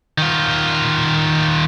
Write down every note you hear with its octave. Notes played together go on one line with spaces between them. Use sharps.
D#3 F4